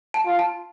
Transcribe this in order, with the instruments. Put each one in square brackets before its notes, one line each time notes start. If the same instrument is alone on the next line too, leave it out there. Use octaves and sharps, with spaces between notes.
[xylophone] A5
[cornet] F4
[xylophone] A5